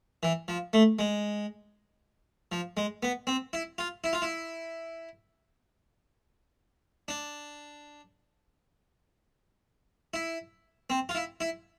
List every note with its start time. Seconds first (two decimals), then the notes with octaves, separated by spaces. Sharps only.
0.23 E3
0.48 F3
0.73 A3
0.99 G#3
2.52 F3
2.77 G#3
3.03 B3
3.27 C4
3.53 E4
3.78 F4
4.04 E4
4.13 F4
4.22 E4
7.08 D4
10.14 E4
10.90 C4
11.09 F4
11.15 E4
11.40 E4